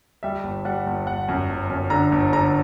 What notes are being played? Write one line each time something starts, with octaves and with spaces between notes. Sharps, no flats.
G3 E5
G1
G3 F#5
G1
G1 F#5
F#2
G1
F#2
D3 A#5
G1
D3 A#5